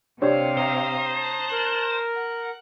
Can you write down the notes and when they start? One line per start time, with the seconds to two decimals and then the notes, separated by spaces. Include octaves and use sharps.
0.22 C3 C4 D4 G4 C5 C#5 F5
0.57 C5 A#5 D#6
1.14 A5 F#6
1.51 A#4
2.13 F#5